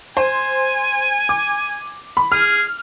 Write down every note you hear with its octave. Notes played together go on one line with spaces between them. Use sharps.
C5 G#5
D6
B5
G#4 F6